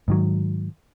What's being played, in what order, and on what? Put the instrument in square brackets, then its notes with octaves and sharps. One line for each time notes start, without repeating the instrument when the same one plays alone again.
[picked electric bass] G#2 D#3 F#3